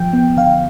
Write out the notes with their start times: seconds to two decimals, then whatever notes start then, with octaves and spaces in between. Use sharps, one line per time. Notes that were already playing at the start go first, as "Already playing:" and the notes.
Already playing: F3 G5
0.13 B3
0.37 D3 F5